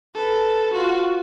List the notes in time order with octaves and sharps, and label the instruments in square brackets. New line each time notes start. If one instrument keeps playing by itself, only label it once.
[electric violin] A4 [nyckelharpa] B4
[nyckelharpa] F4 [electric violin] F#4